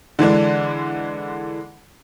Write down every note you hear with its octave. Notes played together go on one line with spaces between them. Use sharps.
D3 E3 G#3 D4